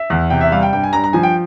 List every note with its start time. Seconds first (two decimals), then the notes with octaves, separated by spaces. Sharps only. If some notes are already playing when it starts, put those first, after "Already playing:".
Already playing: E5
0.10 E2
0.30 C3 G5
0.41 E5
0.51 G3 F5
0.63 G5
0.73 G2 G5
0.83 G#5
0.93 G2 A#5
1.04 A#5
1.13 F3 G#5
1.23 G5